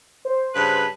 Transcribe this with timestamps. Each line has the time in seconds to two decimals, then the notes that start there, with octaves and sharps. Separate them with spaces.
0.25 C5
0.54 G2 C#3 B4